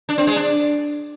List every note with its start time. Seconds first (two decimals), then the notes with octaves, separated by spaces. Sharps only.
0.09 D4
0.18 C4
0.27 G#3
0.36 D4